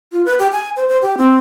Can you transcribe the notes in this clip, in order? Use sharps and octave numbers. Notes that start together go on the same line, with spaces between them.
F4
B4
G4
G#5
C5
C5
G4
C4